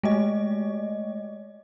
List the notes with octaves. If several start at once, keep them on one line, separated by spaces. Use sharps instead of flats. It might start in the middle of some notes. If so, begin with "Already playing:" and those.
G#3 A3 D#5